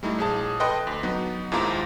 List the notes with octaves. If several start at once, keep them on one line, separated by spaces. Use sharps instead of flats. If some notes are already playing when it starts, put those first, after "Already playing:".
G3 A3 D#4 E4
A#1 G#4 A5
A4 B4 D#5 G5 C6 F#6
D2
F#3 B3 D#4
D#2 G#2 E4 F4 A#5 D6